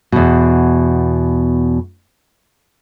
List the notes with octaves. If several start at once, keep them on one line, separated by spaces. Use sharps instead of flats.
E2 B2